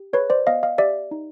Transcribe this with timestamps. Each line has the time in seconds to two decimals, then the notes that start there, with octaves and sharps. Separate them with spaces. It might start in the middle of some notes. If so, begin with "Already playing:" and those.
Already playing: G4
0.13 G#4 B4 C#5
0.30 C5 D5
0.47 B3 D#5 F5
0.63 D#5 F5
0.78 G4 D5 E5
1.11 D#4